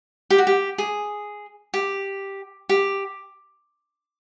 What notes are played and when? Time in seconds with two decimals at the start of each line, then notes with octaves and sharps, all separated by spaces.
0.30 G4
0.38 F#4
0.47 G4
0.78 G#4
1.74 G4
2.69 G4